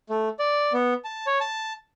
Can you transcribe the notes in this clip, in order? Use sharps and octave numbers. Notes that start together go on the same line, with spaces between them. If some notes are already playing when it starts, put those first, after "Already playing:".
A3
D5
B3
A5
C#5
A5